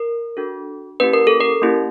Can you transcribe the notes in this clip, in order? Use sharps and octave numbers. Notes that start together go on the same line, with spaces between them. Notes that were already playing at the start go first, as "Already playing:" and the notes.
Already playing: A#4
D4 F#4 A4
A#3 C#4 E4 G4 B4
A#4
A4
A#4
A#3 C#4 E4 G4